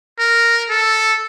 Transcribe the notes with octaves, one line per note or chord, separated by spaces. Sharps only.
A#4
A4